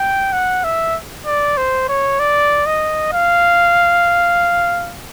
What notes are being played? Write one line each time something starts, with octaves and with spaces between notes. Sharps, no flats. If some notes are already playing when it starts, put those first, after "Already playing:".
Already playing: G5
F#5
E5
D5
C5
C#5
D5
D#5
F5